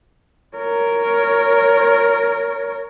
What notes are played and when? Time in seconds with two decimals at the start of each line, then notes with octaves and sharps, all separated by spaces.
0.57 A#4 C#5